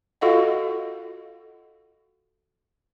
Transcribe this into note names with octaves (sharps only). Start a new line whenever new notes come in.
F4 F#4 A4 D#5 F5 F#5